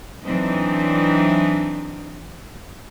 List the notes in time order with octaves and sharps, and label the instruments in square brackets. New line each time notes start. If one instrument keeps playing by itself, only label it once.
[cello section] E3 F#3 C4 D4 D#4